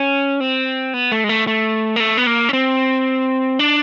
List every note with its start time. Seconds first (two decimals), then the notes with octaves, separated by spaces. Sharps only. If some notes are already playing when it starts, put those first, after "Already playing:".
Already playing: C#4
0.40 C4
0.94 B3
1.12 A3
1.24 G#3
1.29 A3
1.47 A3
1.96 A#3
2.00 A3
2.18 B3
2.27 A#3
2.49 C#4
2.53 C4
3.59 D4